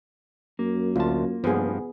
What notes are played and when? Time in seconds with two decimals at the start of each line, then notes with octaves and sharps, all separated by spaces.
0.59 F#2 A#3
0.96 D2 F4 A5
1.44 F1 G2 F3 B3 G#4